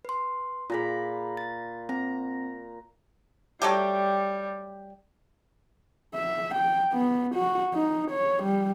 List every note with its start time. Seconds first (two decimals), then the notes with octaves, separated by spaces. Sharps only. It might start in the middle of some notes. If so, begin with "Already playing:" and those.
0.05 B4 C6
0.70 A#2 F4 G#4 A#5 B5
1.37 A6
1.89 C4 A#5
3.62 F#3 G3 A3 G4
6.15 E5
6.55 G5
6.93 B3
7.35 F#4
7.74 D#4
8.11 C#5
8.43 G3